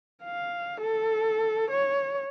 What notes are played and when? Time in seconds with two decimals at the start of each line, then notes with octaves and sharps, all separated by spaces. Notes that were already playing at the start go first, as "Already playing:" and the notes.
0.24 F5
0.80 A4
1.70 C#5